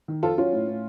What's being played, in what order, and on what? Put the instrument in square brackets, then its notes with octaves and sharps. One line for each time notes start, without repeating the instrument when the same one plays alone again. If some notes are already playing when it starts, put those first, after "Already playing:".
[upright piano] D#3
F2 F4 A4
F#3 C#4 F4
A2
A2